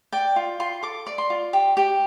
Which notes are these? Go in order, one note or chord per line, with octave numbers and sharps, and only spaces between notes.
D5 G5
F4
F4 C6
A4 D6
D5
C6
F4
G4
G4